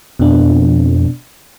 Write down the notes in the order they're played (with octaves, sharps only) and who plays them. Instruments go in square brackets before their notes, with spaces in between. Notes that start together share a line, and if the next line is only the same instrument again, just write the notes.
[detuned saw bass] F2 [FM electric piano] B2 D4